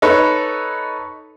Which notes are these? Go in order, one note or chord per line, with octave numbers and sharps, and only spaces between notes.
D#4 A4 B4 C#5